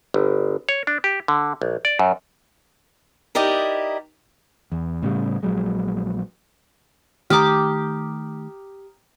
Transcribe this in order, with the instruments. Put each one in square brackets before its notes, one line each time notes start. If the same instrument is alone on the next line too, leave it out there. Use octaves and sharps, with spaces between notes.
[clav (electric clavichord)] G1
C#5
D4
G4
D3
A#1
D5
F#2
[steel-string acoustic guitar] D#4 E4 G4 A#4 D5 D#5
[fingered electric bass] E2
A2 C#3 G3
A#1 F#3 G#3
[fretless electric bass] D#3 A3 [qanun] G4 D6 [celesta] A#5 D#6 F6